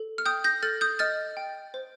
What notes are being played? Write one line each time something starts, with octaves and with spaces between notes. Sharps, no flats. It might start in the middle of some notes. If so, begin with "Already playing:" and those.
Already playing: A4
F6
G5 D#6 G6
G6 A#6
A4 F6 A6
D#6 G6
D#5 F6 A6
G5
C5